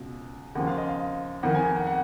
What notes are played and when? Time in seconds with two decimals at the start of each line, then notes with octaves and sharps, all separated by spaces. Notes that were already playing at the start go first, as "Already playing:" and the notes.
Already playing: C#2 B2
0.55 D#2 C#3 F3 F#5
0.67 F5
0.78 D#5
0.89 F5
1.43 F2 D#3 F#5
1.55 G#5
1.65 G#5
1.76 F#5
1.87 F#5